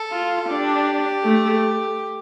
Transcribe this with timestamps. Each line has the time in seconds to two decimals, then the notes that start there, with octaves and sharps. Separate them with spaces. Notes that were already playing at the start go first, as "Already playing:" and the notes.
Already playing: A4
0.12 F4
0.49 D4 G4
1.24 A3